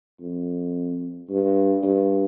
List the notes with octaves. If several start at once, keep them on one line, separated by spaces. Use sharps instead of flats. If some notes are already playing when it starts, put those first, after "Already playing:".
F2
G2
G2